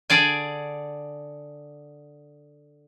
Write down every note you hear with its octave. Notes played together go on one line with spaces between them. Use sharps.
D3 G#4 D5 G#5